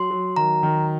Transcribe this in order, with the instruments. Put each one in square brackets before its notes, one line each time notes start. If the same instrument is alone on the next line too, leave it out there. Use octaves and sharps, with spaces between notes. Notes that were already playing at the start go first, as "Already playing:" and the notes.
Already playing: [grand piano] F#3 [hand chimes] C6
[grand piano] F#3
[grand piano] D#3 [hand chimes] A#5
[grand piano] D#3